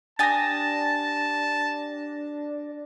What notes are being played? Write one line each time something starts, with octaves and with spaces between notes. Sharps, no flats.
D4 G4 G#5 A5 D#6 A6 A#6